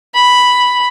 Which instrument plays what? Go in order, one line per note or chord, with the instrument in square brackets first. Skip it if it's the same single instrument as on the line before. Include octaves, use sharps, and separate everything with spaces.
[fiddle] B5